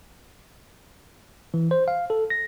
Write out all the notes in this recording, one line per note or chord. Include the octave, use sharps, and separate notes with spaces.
E3
C5
F5
A4
A#6